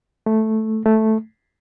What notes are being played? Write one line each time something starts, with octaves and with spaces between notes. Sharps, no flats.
A3
A3